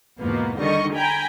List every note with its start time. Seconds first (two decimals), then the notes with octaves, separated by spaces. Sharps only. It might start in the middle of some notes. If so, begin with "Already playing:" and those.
0.20 E2 G#2 B2 F3 A#3 B3
0.57 D3 D#3 G3 D#5 C#6
0.95 G5 G#5 A#5 B5